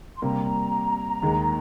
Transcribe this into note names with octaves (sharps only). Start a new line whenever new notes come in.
C6
C3 G3 A#3 A#5
D#2 D#3 G#3